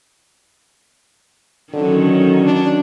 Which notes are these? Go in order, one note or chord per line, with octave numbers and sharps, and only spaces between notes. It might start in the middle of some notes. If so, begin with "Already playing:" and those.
D3 D#3 F#3 C#4
D3
D4